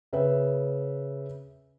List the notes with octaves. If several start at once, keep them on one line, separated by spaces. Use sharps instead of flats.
C#3 B4 E5